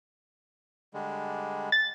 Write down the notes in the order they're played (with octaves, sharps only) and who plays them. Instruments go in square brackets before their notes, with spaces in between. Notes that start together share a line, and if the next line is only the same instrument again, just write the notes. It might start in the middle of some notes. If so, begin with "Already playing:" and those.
[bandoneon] D3 G3 G#3
[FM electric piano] A6